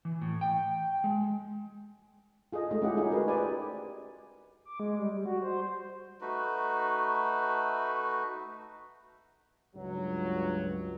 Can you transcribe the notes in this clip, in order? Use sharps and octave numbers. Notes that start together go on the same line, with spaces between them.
E3
A2
G5
G#3
F4 G#4 A4 D#5
G#3 A3 D#4 D#5
C#4 E4 F4 G4 G#4 F#5
D#4 F4 G#4
F#4 G#4 A#4 B4
G4 B4 C5 D5 G#5
D6
G#3
G3
G3
F#4
C5
A3 D#4 F#4 B4
C#2 G2 F#3